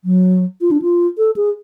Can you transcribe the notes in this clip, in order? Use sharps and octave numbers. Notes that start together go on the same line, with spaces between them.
F#3
F4
D4
F4
A4
G#4